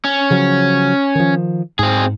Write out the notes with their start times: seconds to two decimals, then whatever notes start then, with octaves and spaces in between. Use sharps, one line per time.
0.04 C#4
0.30 C#3 F3 F#3
1.15 D#3 F3
1.79 G#2 C4 G#4